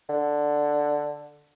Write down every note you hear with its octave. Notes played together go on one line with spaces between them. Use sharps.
D3